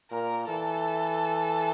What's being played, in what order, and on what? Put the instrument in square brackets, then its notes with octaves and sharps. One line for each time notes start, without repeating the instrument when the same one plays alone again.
[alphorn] A#2 [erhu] A#4
[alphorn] E3 [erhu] A4